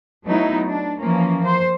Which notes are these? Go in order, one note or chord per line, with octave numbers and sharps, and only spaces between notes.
F#3 A3 B3 D#4 E4
D4
E3 F3 A#3 C#4
C5